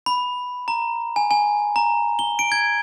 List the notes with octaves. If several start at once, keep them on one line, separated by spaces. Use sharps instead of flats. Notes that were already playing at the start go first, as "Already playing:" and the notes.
B5
A#5
G#5
G#5
A#5
G7
D7
G#6